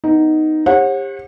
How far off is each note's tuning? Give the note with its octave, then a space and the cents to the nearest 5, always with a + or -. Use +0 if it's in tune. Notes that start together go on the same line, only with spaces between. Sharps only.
B3 +10 D#4 +0
G4 +30 C#5 -45 F#5 -20